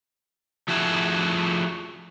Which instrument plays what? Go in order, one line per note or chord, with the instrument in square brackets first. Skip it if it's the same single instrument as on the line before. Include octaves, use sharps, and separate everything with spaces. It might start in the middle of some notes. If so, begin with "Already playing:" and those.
[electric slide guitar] F3 A3 E4 F#4 G#4 E5